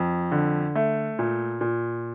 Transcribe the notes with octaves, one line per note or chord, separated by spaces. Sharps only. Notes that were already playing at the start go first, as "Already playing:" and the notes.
Already playing: F2
D3
A3
A#2
A#2